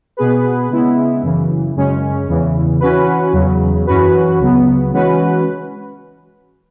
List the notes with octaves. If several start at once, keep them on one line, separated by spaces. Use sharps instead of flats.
B2 B3 G#4 B4
C#3 G#3 B3 E4
F#2 C#3 E3
F#2 C#3 G#3 C#4
E2 C#3 E3
E3 C#4 F#4 B4
E2 C#3 F#3
F#2 E3 C#4 F#4 B4
C#2 C#3 F#3 B3
E3 G#3 C#4 F#4 B4